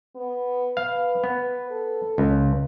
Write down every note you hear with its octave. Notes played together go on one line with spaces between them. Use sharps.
B3
B4 F5
B3
A4
C#2